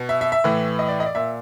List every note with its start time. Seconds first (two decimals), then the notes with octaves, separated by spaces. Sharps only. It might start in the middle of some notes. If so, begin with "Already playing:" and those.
Already playing: B2
0.09 E5
0.21 E5
0.32 E5
0.44 A2 E3
0.79 D#5
0.88 D5
1.00 D#5
1.06 D5
1.15 A#2 E5